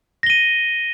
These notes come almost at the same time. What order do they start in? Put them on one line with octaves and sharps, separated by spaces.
A#6 G7 D#7